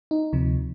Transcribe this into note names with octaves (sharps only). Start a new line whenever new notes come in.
D#4
D2 C3 F3